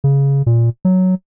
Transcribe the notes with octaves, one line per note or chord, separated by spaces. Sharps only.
C#3
A#2
F#3